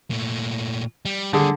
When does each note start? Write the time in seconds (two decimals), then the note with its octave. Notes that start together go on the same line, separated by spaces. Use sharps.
0.11 A#2 A3
1.05 G3
1.33 D3 G3 A#3 G#4